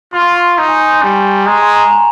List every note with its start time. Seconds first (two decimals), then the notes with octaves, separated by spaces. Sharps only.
0.13 F4 C6
0.21 C#6
0.30 C6
0.57 D#4 A#5
0.68 G#5
0.80 G#5
0.91 C6
1.02 G3 C#6
1.46 G#3 A#5
1.62 G#5
1.76 A#5
1.91 A#5